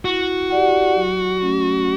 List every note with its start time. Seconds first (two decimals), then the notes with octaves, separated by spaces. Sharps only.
0.05 E4 F#4
0.50 G4 D5 F#5
0.96 F#3
1.42 A3 C#4